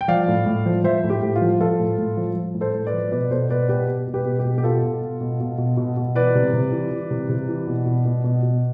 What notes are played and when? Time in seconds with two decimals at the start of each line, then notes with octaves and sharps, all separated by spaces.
0.01 G5
0.08 F3 D5 F5
0.28 A2
0.46 A2
0.66 F3
0.84 F3 C5 E5
1.04 A2
1.10 G4
1.22 A2
1.36 F4
1.41 F3
1.60 F3 F4 A4
1.79 A2
1.98 A2
2.17 F3
2.36 F3
2.55 A2
2.61 A4 C5
2.74 A2
2.87 B4 D5
2.94 F3
3.11 B2 B4 D5
3.31 B2 A4 C5
3.49 B2 B4 D5
3.68 B2 G4 B4
3.87 B2
4.07 B2
4.14 G4 B4
4.25 B2
4.39 G4
4.45 B2
4.58 G4
4.64 B2 F4 A4
4.83 B2
5.02 B2
5.21 B2
5.40 B2
5.58 B2
5.77 B2
5.97 B2
6.15 E3 B4 D5
6.35 C3
6.53 C3
6.72 E3
6.91 E3
7.10 C3
7.29 C3
7.49 E3
7.67 B2
7.86 B2
8.05 B2
8.24 B2
8.43 B2